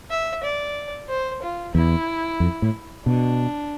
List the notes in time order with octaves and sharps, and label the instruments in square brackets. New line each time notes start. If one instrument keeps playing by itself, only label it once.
[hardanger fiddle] E5
D5
C5
F4
[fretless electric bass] E2 [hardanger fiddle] E4
[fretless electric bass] F2
A2
[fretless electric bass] B2 [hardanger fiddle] D4